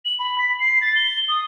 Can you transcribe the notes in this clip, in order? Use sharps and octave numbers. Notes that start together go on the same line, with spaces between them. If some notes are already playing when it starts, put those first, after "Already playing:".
F#7
B5
B6
C7
A6
G7
D#6